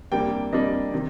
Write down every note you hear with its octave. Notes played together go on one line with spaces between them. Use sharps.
F2 C3 G3 A#3 D4 G5
F2 C3 G3 A#3 D4 D#5
C3 D#3